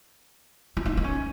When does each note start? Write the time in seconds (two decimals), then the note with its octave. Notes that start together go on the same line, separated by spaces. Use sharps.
0.77 E4
0.85 D#4
0.97 D#4
1.04 C#4